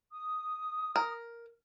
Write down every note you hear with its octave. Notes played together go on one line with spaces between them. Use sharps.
D#6
A#4